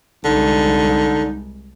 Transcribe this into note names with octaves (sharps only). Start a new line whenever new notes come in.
C2 D3 G#3 D#4